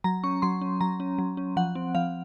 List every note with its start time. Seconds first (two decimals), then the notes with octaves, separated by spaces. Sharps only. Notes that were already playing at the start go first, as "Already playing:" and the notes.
0.04 F#3 A#5
0.24 C#4 C#6
0.42 F#3 C6
0.61 C#4
0.81 F#3 A#5
1.00 C#4
1.18 F#3
1.37 C#4
1.57 F3 F#5
1.75 C4
1.95 F3 F5